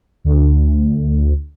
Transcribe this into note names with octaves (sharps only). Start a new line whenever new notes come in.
D2